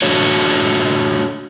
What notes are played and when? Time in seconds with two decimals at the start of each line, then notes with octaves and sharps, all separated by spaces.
0.02 A3 D4 F4 F#4 C#5